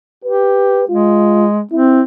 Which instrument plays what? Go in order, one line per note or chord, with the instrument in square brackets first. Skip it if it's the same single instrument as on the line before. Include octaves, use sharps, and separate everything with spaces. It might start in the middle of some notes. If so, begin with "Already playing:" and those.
[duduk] G4 [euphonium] B4
[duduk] G#3 [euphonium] F4
[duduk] C4 [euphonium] E4